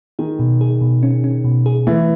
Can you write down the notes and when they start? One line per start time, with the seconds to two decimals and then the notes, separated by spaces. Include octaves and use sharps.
0.19 D#3 G#4
0.39 B2
0.61 G#4
0.82 B2
1.03 C#4
1.24 C#4
1.45 B2
1.66 G#4
1.87 E3 A3